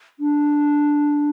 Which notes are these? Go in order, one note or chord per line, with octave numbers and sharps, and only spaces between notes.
D4